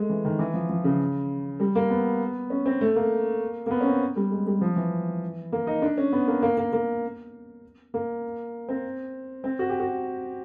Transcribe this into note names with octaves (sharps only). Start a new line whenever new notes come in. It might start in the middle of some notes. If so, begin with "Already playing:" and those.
Already playing: G#3 A3
E3
D#3
E3
F3
F3
C#3
G3
A#3
B3
C#4
C4
A3
A#3
A#3
B3
C#4
C4
G3
G#3
G3
F3
E3
A#3
D#4
D4
C#4
B3
A#3
A#3
A#3
A#3
A#3
C4
C4
F#4
G4
F#4